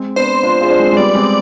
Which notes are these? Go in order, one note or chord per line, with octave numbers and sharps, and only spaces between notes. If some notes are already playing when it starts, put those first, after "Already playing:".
Already playing: G#3 C4
B3 D4 C5
D4 F4
F4 G#4
D4
G#3 C4
G#3
G3 B3 D5
G#3 C4